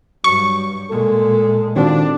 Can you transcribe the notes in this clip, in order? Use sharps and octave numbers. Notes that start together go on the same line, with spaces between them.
G2 F#3 C#6
A#2 G#3 A4
D#3 C4 D4 F4 F#4